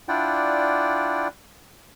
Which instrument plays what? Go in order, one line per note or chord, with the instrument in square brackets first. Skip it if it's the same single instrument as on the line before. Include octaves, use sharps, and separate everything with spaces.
[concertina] D4 E4 F4 D5 F#5 G5